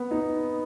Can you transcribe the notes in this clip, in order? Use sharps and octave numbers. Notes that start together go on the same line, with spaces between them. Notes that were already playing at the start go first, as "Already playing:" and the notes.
Already playing: B3
D#4